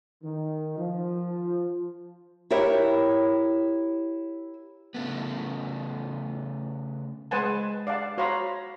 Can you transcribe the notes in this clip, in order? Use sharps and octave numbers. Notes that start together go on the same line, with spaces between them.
D#3
F3
E4 G4 A#4 C#5 E5
C#3 A3 B3
G#3 B4 C5 F#5 G#5 A5
D5 F5 F#5 A5
F#4 C5 C#5 F5 A#5 B5